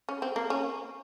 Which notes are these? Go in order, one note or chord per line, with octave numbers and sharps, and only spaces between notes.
C#4
C4
A#3
C#4